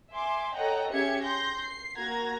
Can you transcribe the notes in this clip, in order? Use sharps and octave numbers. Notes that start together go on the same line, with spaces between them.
E5 G#5 C6 D6
A4 C#5 D#5 F#5 G5 A#5
C#4 G4 G#4 E5 G#6 C#7
C6 G6 A#6
C7
A#3 F#4 A#5 G#6